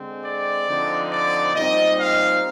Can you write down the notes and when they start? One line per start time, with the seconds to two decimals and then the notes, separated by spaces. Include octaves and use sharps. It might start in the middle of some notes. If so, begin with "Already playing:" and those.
Already playing: D3 G#3 C4
0.25 D5
0.68 D3 F3 C4 D#4
1.11 D5
1.54 A#2 G3 C4 D#4 D#5
1.98 F5